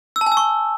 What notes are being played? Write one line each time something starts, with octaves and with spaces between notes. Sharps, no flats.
E6
A5
G#5
E6
C#6